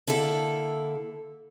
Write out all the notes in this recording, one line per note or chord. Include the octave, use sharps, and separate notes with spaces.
D3 A#3 E4 A4